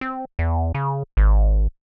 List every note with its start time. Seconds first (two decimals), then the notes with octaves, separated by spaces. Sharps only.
0.01 C4
0.39 E2
0.75 C#3
1.17 G#1